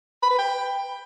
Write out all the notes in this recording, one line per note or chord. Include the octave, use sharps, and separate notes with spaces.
B5
B4
G5